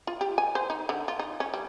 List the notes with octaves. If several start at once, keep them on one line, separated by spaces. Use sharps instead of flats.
F4
G4
G#5
C5
D#4
D3
F4
D#4
C#4
G3